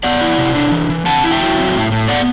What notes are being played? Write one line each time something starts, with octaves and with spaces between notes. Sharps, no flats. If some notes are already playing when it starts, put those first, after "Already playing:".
B3 D5 F#5
E4
C3
D4
E3
E3
C4 F#5 A5
E4
E5 G5
F#3
C4
A2
A2
B3 D5 F#5